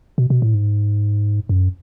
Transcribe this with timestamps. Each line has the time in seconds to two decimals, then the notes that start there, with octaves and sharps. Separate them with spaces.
0.18 B2
0.30 B2
0.42 A2
0.54 G#2
1.49 F#2